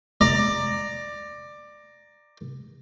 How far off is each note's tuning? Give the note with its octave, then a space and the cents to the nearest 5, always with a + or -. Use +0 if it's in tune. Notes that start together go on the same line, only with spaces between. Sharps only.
D5 +15 A#5 +0